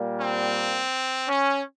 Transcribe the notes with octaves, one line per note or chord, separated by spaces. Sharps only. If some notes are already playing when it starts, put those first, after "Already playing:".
Already playing: A#2 G3 A#3
C4
C#4